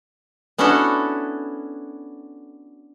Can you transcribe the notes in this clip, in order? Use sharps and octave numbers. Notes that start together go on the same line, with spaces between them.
B3 C#4 D4 E4 F#4 A4